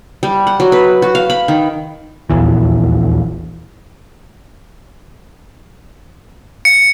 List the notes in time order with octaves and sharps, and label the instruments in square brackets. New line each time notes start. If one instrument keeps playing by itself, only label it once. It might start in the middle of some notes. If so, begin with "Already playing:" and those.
[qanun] G3
F#5
F#3
B4
F#4
F5
B5
D#3
[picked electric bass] D#1 A#1 E2 E3
[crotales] C#7